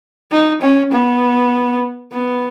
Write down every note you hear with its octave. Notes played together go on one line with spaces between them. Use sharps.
D#4
C#4
B3
B3